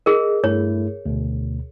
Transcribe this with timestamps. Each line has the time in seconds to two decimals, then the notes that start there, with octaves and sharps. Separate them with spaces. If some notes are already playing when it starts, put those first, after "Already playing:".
0.06 G#4 A#4 D#5
0.44 G2 A3 E4 C#5
1.06 D2 B2